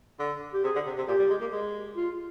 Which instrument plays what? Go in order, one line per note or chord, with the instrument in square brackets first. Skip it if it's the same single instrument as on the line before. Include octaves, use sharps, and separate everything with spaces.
[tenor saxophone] D3
[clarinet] G4
[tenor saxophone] C3 [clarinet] G#4
[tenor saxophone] D3
C3
C3
[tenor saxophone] A#2 [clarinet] G4
[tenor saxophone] G3
G#3
A#3
G#3
[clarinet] F4